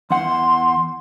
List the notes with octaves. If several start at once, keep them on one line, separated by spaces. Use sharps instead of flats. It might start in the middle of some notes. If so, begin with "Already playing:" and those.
E2 F#5 C6